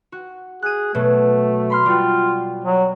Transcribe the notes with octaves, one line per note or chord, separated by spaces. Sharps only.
F#4
G#4 F#6 D#7
B2 F#3 A3
B5 C6 F6
G3 F4 F#4
F#3